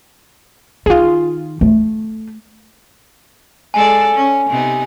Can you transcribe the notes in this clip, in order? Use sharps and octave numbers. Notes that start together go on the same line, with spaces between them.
D#3 F4 G#4
A3
G#3 A4 D5 G#5
C#4
C3 B3 D#4